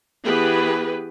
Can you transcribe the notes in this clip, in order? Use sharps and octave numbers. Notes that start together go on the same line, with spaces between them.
E3 B3 G4 G#4 B4